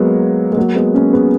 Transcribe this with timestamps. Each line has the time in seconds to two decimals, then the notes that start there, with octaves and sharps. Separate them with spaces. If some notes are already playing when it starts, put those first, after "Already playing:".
Already playing: F#3 G#3 A#3 B3
0.52 G#3
0.57 F#3 A#3
0.75 G#3 B3
0.94 A#3 C#4
1.13 G#3 B3